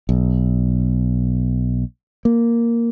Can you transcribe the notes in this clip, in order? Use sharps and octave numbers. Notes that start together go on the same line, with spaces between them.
B1
A#3